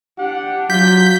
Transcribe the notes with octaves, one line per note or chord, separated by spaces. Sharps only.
D4 G4 F#5
F#3 F4 G6 B6